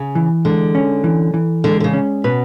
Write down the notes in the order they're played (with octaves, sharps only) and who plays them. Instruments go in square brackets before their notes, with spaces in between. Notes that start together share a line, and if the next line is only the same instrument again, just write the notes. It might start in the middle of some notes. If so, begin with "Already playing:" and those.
Already playing: [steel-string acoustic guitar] C#3
[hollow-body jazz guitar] E3
[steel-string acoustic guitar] D3 [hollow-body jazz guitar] G#3
[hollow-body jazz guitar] C#4
E3
E3
[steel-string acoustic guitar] D3 [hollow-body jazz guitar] G#3
[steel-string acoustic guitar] D3
C#3
[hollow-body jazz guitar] C#4
[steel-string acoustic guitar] B2 [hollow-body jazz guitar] B4